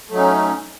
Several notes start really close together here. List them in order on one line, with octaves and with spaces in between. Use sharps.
A3 F#3 D#4 C#4